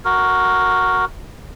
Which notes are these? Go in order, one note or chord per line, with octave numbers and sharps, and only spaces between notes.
F#4 A#4